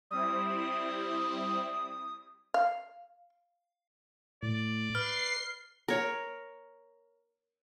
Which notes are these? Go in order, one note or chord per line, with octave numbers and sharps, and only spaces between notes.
G3 C4 E4 D#6
F5
A2 D5
B4 F6 C7
A#4 C#5